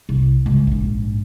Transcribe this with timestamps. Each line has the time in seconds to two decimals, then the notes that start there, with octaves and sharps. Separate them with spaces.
0.09 C2
0.46 C#2 G#2
0.67 A#1 G#2